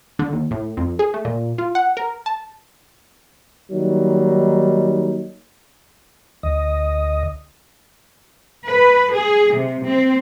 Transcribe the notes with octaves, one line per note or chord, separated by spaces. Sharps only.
D3
D#2
A2
F2
G#4
A3
A#2
F4
F#5
A#4
A5
D#3 F#3 G3 A#3 D#4
D2 D#5
B4
G#4
C3
C4